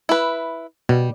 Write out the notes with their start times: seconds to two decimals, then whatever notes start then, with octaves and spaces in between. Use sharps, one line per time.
0.09 E4 B4
0.89 B2 G3